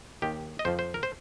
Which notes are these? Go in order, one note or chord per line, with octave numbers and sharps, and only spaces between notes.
D#2 D#3 G4
D#5
F2 F3 C5
C5
A#4
C5